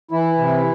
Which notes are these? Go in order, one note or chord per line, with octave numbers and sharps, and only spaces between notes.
E3 E4
C3